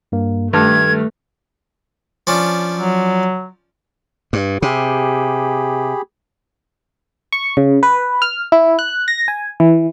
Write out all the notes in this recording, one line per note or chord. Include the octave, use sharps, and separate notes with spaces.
G2 A#3
G2 D#3 G3 A3 F6 G#6
F3 C#4 D4
F#3
G2
C3 G4 G#4 B5
C#6
C#3
B4
F6
E4
F#6
A#6
G#5
E3